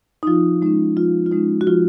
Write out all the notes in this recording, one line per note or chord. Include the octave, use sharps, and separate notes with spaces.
D#4
F3 F4
G#3 C#4 D#4
F3 F4
F4
G#3 C#4 D#4
F#4
F3 F4